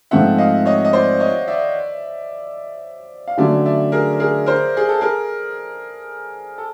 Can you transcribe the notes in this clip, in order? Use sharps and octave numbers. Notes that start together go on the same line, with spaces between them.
G#2 F3 A3 C4 F4 E5 F#5
D#5 F5
C#5 D#5
D#5
C5 D5
C#5 D#5
D5 E5
F5
D3 F#3 A3 C#4 D5 E5
D5 E5
G#4 A#4
G#4 A#4
A#4 C5
G#4
A4
G#4 A#4
A4